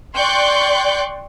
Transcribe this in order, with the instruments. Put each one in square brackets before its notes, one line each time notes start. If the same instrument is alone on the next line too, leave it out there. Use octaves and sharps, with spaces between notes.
[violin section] D5 G5 C6 C#6 F#6 G6